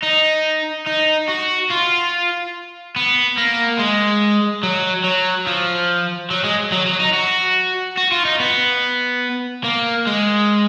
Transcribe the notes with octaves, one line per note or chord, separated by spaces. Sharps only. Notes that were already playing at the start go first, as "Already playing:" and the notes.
D#4
D#4
F#4
F4
B3
A#3
G#3
F#3
F#3
F3
F#3
G#3
F#3
F#3
D#4
F#4
F#4
F4
D#4
B3
A#3
G#3